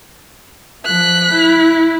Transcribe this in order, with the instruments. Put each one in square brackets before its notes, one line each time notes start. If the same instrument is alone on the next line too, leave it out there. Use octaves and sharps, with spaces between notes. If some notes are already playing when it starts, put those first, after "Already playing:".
[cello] F3 [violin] F#6 B6
[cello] E4